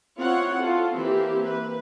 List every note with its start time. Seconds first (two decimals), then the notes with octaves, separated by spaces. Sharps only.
0.20 C4 E4 F4 C#5 F#5
0.62 F4 A4
0.94 E3 A#3 C4 G4 E5
1.47 B4